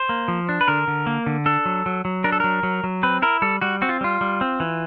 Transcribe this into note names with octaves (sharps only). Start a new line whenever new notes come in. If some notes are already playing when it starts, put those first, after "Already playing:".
Already playing: C5
A#3
F3
D4
B4
D3 A#4
D3
A#3
D3
D4 A4
F#3
F#3
F#3
D4 A#4
A4
F#3 A#4
F#3
F#3
C4 B4
E4 A#4
G3 A4
G3 F#4
C4 F#4
F4
G3 F4
G3
C4
E3